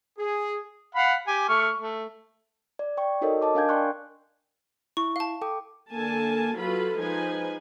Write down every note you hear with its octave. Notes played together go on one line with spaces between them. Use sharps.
G#4
F5 F#5 B5
G4 G#5
A3 C#6 F6
A3
D5
D5 G5 C#6
D#4 F#4 A4 A#4 C#5 D#5
D#5 A5 D6
D4 A#4 F5 G#5 G6 G#6
D5 G5 C6 C#6 F#6
E4 C#6
F5 A5
A4 G5 D6
D3 A#3 A4 G#5 A5
F#3 F4 F#4 A4 B4 B5
F3 G#3 D#4 B4 G#5